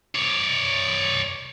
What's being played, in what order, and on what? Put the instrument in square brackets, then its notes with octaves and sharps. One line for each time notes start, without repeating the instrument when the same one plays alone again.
[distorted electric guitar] C#5 D5